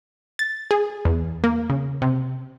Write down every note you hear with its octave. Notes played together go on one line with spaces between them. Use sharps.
A6
G#4
E2
A#3
C#3
C3